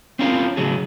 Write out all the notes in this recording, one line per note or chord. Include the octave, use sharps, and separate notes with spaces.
C4 C#4 F4 A#4
A2 C#3 F#3 G#4